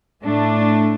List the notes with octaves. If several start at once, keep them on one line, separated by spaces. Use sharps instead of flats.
A2 A3 D4